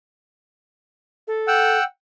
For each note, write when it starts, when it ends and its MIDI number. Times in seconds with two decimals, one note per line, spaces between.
1.28 1.79 69
1.48 1.84 78
1.48 1.84 79
1.48 1.84 88